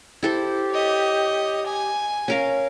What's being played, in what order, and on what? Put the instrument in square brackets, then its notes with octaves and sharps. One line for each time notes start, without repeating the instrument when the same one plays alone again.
[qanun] E4 A4 C5 [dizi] G4
[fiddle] C#5 D#5
G#5
[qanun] C#4 A#4 F5